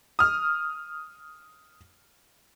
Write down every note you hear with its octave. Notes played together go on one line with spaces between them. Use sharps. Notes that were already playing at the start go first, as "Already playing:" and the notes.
D#6 F6